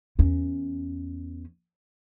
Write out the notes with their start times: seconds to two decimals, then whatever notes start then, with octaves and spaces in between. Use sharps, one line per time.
0.19 E2 C#4